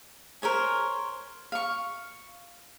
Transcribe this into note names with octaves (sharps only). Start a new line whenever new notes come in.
A#4 C5 C#5 G#5
F5 C#6